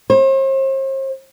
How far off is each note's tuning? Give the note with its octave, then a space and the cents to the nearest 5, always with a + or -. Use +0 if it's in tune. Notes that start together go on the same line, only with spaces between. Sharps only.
C5 +45